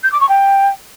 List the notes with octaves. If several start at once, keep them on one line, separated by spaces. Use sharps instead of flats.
G6
D6
C#6
G5